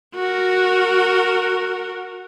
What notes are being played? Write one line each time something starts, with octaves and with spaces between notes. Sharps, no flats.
F#4 A#4